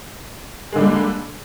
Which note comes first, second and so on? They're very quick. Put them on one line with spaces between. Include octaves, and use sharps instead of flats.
G#3 D3 G3 A#3